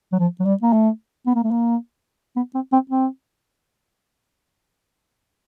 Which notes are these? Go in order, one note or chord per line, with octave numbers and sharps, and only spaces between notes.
F#3
F3
F#3
G3
A#3
A3
B3
A#3
A3
A#3
B3
C4
C4
C4